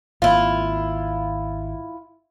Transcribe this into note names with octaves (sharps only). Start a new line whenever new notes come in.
G#1 A#3 E4 F4 F5